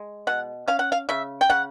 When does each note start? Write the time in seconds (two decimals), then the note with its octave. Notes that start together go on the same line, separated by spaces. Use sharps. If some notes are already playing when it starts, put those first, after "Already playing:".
Already playing: G#3
0.27 B2 F#5
0.68 C#4 F5
0.79 F#5
0.92 F5
1.09 C#3 E5
1.41 G5
1.50 C#3 F#5